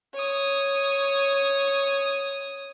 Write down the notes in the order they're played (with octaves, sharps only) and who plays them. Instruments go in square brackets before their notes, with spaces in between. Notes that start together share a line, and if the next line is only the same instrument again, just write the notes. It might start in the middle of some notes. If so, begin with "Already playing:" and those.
[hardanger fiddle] C#5 D#6